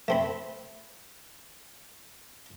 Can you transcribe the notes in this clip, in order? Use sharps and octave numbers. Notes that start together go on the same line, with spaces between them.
A3 C4 B5